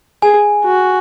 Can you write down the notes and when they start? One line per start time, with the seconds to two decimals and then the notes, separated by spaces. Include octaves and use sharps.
0.22 G#4 G#5
0.64 F#4